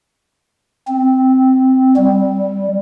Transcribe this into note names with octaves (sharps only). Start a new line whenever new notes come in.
C4
G3